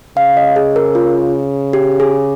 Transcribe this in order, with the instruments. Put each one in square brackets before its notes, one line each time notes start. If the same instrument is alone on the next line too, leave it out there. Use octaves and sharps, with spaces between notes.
[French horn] C#3 [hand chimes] F5
[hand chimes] D#5
G#4
A#4
F4
G4
G#4